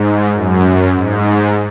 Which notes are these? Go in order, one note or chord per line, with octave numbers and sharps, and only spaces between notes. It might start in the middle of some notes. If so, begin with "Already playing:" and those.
Already playing: G#2
F#2
G#2